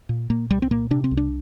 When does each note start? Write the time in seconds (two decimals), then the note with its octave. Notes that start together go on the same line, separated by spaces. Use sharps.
0.09 A#2
0.30 A#2 A#3
0.50 C2 G3
0.62 C4
0.71 A#2 A#3
0.91 C3 D4
1.04 C4
1.11 C2
1.17 D4